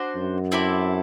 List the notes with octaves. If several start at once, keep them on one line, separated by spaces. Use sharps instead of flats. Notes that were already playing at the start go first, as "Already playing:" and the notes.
Already playing: D4 F#4 C5
F#2
C4 E4 A4 D5